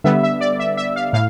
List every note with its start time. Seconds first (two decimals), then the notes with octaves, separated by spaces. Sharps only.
0.04 D3 G3 B3 E5
0.23 E5
0.41 D5
0.59 E5
0.77 E5
0.96 F5
1.13 A2 F5